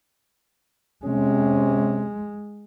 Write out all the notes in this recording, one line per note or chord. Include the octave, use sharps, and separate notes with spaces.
C3 G#3 C#4